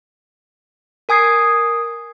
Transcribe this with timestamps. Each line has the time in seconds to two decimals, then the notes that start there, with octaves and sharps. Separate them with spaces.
1.09 A#4 G#5 D#6 G#6 C7